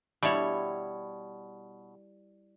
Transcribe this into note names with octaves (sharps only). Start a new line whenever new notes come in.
B2 G3 E4 C#5